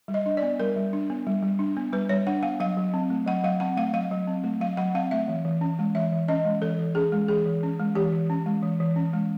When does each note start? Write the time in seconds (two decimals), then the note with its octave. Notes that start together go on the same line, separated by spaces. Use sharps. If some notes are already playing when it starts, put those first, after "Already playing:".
0.08 G3
0.14 D#5
0.26 D4
0.37 D5
0.42 B3
0.59 G3 A#4
0.76 G3
0.93 D4
1.10 B3
1.27 G3
1.42 G3
1.59 D4
1.77 B3
1.93 G3 B4
2.09 G3 C#5
2.27 D4 F#5
2.43 B3 F5
2.60 F#3 F5
2.77 F#3
2.94 C4
3.10 A3
3.26 F#3 F#5
3.44 F#3 F5
3.60 C4 F#5
3.77 A3 F5
3.93 F#3 F5
4.11 F#3
4.27 C4
4.44 A3
4.61 F#3 F5
4.77 F#3 F#5
4.95 C4 F5
5.11 A3 E5
5.28 E3
5.45 E3
5.61 C#4
5.79 G#3
5.95 E3 E5
6.12 E3
6.28 C#4 D#5
6.45 G#3
6.62 E3 A4
6.78 E3
6.95 C#4 G#4
7.12 G#3
7.28 E3 G#4
7.46 E3
7.63 C#4
7.80 G#3
7.95 E3 G4
8.12 E3
8.30 C#4
8.46 G#3
8.63 E3
8.80 E3
8.96 C#4
9.13 G#3